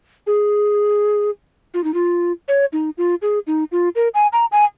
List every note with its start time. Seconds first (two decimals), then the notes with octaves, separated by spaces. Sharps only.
0.27 G#4
1.74 F4
1.84 D#4
1.94 F4
2.48 C#5
2.73 D#4
2.98 F4
3.22 G#4
3.47 D#4
3.72 F4
3.95 A#4
4.14 G#5
4.33 A#5
4.52 G#5